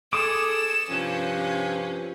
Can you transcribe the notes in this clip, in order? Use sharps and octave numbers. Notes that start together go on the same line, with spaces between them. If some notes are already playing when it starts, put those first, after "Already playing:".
G#4 A4 D6 D#6 E7
G2 C3 F3 C#4 B4